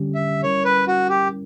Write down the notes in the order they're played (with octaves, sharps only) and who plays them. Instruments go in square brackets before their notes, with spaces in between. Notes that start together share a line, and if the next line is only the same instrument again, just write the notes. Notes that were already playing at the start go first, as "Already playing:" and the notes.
Already playing: [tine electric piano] D3 G3 C#4 G4
[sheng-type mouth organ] E5
[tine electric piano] G3 C#4 E4 A#4 [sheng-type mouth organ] C#5
[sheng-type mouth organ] B4
F#4
G4